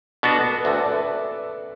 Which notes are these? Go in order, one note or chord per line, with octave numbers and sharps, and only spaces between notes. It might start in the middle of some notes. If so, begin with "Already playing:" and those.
B2 B3 D4 F#4 B4
A4
A4
B4
D2 D3 A3 F#4 B4
A4 D5
B4 E5